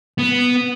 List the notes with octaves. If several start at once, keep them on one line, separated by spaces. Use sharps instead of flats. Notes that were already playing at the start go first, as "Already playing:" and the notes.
B3